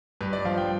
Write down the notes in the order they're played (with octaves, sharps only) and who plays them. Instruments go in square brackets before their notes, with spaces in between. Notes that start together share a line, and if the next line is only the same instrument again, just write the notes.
[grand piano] G2 B4
D5
F3 F5
G5